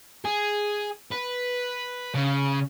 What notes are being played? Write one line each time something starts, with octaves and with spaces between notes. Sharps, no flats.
G#4
B4
C#3